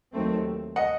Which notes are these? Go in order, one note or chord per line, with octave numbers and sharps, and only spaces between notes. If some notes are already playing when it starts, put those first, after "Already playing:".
D#2 D#3 F#3 A3 C4
D#5 F#5